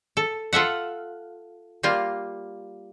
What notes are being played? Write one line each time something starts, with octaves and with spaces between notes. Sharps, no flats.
A4
F4 A4 E5 F#5
G3 A#3 F4